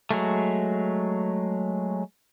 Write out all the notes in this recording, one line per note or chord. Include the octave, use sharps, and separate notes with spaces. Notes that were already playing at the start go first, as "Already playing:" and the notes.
F#3 G#3 A3